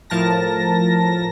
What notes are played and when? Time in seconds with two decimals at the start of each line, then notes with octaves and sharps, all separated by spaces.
0.10 A2 F3 A#4 A5 A#6